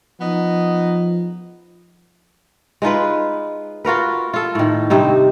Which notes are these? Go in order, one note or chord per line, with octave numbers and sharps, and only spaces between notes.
F3 B3 D#4 D#5
G#3 D#4 F4 B4
F4 F#4 A#4 B4
F4 A4
A2 D#3
G2 C3 C4 D#4